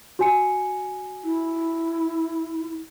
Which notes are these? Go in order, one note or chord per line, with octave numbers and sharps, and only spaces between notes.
F#4 G#5 C#7
E4